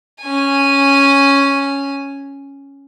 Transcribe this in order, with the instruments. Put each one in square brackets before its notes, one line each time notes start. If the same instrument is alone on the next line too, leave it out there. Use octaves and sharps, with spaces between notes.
[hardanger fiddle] C#4 G#5